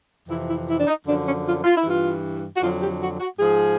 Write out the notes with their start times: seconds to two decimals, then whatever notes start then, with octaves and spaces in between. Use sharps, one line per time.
0.28 F2 C3 E3 E4
0.48 E4
0.67 E4
0.78 D4
0.87 D#4
1.06 F#2 D3 F3 D4
1.26 C#4
1.45 F4
1.64 F4
1.76 E4
1.84 G2 E3 F4
2.56 F#4
2.61 F2 D3 F#3 F4
2.81 G4
3.00 F#4
3.20 F#4
3.39 G#2 F3 G#4